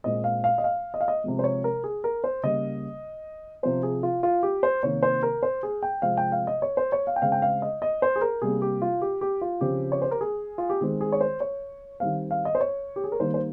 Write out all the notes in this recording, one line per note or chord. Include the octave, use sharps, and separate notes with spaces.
A#2 G#3 C4 D#5
F5
F5
D#5
F5
D#5
F5
D#5
C3 F3 G#3
C5
C#5
A#4
G#4
A#4
C5
C#3 G3 A#3 D#5
C3 F3 C4 C5
G#4
F4
F4
G4
C5
C3 D#3 A#3 C#5
C5
A#4
C5
G#4
G5
C3 F3 G#3 C4 F5
G5
F5
D#5
C#5
C5
C#5
F5
G5
C#3 G#3 C4 F5
G5
F5
D#5
D#5
C5
G#4
A#4
C3 G3 A#3 G#4
G4
F4
G4
G4
F4
C#3 F3 C4 G4
C#5
C5
A#4
G#4
F4
G4
D#3 G#3 C4 G#4
G#4
C#5
C5
C#5
D#3 G3 C4 F5
F5
D#5
C5
C#5
G4
G#4
A#4
D#3 G3 A#3 C5
C5